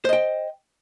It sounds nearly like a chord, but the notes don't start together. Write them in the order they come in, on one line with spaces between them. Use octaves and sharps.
C5 D#5 G5